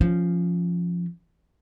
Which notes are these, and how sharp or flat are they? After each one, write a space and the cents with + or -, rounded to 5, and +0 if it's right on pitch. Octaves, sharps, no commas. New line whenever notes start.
F3 +0 C#4 +0